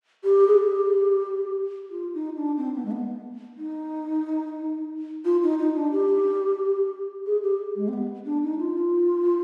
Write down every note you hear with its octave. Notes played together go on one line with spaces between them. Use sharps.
G4
G#4
G4
F4
D#4
D4
C4
B3
G#3
B3
D#4
F4
D#4
D#4
D4
G4
G#4
G4
G#3
C4
B3
D4
D#4
F4